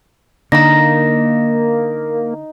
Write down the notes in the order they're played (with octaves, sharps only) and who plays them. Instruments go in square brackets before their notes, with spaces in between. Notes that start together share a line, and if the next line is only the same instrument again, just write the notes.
[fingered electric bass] D3 [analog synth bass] A#3 [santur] D#4 [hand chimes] A#5 A#6